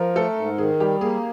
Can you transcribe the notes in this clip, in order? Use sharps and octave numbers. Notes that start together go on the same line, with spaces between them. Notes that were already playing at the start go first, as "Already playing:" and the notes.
Already playing: F3 A#4
A3 A4
G#2
D#3 G#4
G3 G4
A#3 G#4